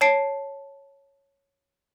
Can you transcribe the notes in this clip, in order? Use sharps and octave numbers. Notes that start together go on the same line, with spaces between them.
C#5 A5 C7 D7